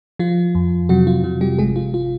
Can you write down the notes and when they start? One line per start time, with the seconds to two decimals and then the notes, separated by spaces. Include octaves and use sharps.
0.19 F3 F4
0.55 F2
0.89 C3 F#3 F#4
1.07 F4
1.24 C3 F4
1.41 G3 G4
1.59 G#1 G#3 G#4
1.76 F4
1.94 F4